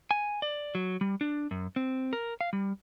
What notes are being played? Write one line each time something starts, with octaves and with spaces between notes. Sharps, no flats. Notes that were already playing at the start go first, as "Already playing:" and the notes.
G#5
D5
F#3
G3
D4
F#2
C4
A#4
F5
G3